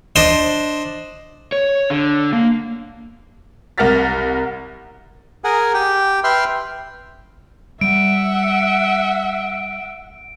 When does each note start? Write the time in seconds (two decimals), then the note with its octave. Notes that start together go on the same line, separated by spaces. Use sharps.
0.16 D4 C5 D#5
1.52 C#5
1.90 D3
2.33 A#3
3.78 C2 A#4 F#5 F6 A6 B6
5.44 G#4 A#4 F#5 G#5
5.74 G4 G5
6.24 B4 E5 G5 C6 F6
7.81 G3 E5 F#5 D7